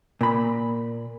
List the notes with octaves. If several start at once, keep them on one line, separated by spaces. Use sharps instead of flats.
A#2 B5